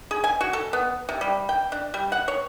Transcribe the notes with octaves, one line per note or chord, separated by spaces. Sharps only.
G#4
G#5
F#4
A4
B3
C3
G3
G5
D4
G3
F#5
C#5